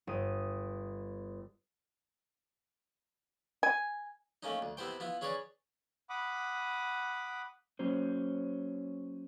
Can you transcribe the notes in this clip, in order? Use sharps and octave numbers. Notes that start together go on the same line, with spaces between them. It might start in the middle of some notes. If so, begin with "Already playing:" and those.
G1 D#6
G#5
A3 A#3 C#4 D#4
D2
C3 B3 E4 C5 G5
B3 E4 F4
C#4 G#4 B4 C#5 D5
F#5 B5 D6 D#6
F#3 A#3 C#4 C5